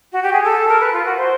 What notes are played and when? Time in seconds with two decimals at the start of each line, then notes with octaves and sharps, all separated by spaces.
0.12 F#4
0.22 G4
0.32 G#4
0.43 A4
0.68 A#4
0.80 B4
0.92 F4
1.05 F#4
1.17 C5